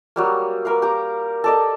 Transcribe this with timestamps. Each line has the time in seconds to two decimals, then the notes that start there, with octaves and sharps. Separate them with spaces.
0.16 F#3 G3 A#3
0.65 A#3 A#4 B4 F5
0.82 G4 A#5
1.44 A4 D5 D#5